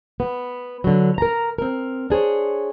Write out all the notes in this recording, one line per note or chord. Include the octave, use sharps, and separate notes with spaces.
B3
D3 F#3
A#4 A#5
C4 A#4
D4 G#4 C5 C#5